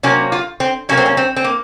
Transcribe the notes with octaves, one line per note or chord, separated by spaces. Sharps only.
C3 F#3 A#3 C#4
F4
C4
C3 F#3 A#3 C#4
C4
C#4
C4
C4
A#3